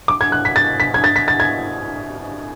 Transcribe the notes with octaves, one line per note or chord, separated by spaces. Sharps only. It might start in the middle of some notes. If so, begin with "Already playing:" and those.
D6
G#6
F#6
B6
A6
B6
G#6
A6
B6
A6
G#6